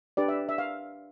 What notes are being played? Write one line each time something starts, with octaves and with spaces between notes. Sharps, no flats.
D4 G4 B4 D5
E5
E5
F5